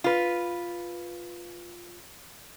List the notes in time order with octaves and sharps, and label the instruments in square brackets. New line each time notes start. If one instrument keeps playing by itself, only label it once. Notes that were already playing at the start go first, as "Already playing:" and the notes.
[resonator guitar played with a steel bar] F4 B4